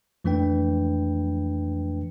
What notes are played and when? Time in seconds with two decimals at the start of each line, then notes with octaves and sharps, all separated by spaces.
0.24 F2 E3 A3 D4 B4 G5